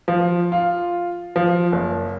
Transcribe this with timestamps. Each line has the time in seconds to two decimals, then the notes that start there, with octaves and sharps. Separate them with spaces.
0.08 F3
0.52 F4
1.36 F3
1.72 F#1